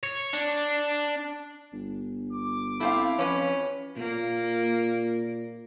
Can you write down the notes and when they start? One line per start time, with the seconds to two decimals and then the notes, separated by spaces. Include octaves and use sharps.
0.03 C#5
0.33 D4
1.73 G1
2.33 D6
2.80 A3 C4 E4 F5
3.19 F2 C#4 B4
3.97 A#2 A#3